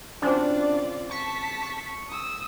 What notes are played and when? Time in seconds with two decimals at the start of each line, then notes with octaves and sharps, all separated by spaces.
0.22 C#3 C4 D4 F4 F#4 D5
1.11 A5 C#6 B6
1.62 C#6
2.10 D#6 E6